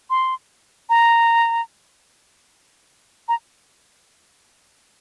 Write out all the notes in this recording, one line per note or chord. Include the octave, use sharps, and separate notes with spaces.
C6
A#5
A#5